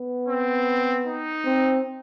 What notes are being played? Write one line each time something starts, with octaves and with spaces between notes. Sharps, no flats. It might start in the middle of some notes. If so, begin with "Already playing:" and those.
Already playing: B3
C4
D#4
C4